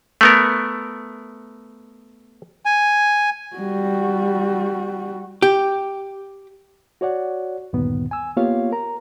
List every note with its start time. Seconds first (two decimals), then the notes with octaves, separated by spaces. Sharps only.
0.21 A3 B3 A#4
2.65 G#5
3.56 G3 F#4
5.42 G4
7.01 F#4 C#5 D5 F#5
7.73 D2 G2 A#2 D#3 B3
8.11 G#5 E6
8.37 A#3 B3 F4 G4 C#5 F5
8.72 A#4 A#5